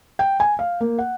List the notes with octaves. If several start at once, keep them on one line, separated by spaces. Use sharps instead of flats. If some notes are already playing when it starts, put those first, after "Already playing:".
G5
G#5
F5
A#3
F#5